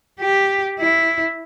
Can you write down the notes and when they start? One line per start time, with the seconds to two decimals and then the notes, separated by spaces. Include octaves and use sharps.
0.20 G4
0.79 E4